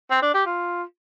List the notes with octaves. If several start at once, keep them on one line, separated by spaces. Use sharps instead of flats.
C4
D4
G4
F4